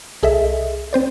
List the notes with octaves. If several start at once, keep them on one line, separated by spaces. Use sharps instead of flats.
C2 G#4 A4 D#5 E5
C4 C5 D5